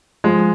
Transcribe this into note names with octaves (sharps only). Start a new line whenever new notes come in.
F3 G#3